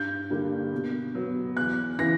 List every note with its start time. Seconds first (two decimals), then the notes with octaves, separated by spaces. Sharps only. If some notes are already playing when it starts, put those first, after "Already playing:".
Already playing: G2 G6
0.30 D3 G3 A#3
0.72 B2
1.15 F#3 B3
1.56 E2 F#6
1.99 C#3 E3 A#6